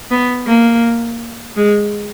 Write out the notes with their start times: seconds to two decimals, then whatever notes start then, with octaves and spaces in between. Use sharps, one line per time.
0.11 B3
0.47 A#3
1.57 G#3